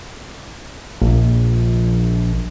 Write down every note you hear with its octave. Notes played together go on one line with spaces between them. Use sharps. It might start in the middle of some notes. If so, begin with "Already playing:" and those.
A#1